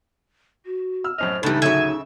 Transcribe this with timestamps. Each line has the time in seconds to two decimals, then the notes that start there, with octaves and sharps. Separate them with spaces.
0.65 F#4
1.04 E6 F6
1.18 F#2 A2 C5 D#5 F6
1.43 C#2 A2 E3 G3 D4 D#4
1.62 D2 A2 C#3 F#3 E5 G#5